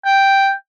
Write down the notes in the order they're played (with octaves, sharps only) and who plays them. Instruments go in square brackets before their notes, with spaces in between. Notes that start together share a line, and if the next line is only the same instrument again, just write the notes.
[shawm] G5